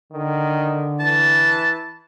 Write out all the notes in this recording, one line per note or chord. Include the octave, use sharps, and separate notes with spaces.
D3 D#3
E3 A5